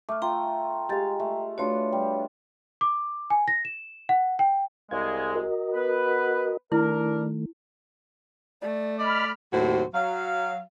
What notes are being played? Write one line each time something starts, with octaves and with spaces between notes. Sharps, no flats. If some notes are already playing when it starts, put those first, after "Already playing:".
A3 D6 F6
F4 G5 A#5
G#3 G4 F5 A6
A3
A3 D4 F4 F#4 B4 C#5
G3
D6
G#5
A#6
E7
F#5
G5
C2 G#3 F5 G#6
F#4 A#4 D#5
B3 B4
D#3 A3 D4 E4 A#4
A3 D5
D5 D#5 B5 F6
D#2 A2 C3 F#3 F#4 C5
F#3 F5